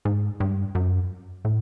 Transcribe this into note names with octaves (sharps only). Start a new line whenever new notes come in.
G#2
G2
F#2
A2